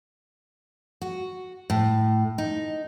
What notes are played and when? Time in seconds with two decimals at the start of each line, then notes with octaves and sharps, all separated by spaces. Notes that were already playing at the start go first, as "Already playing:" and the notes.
1.01 F#4
1.70 A2
2.38 D#4